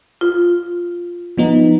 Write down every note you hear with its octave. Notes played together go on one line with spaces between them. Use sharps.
F4
F3 B3 D#4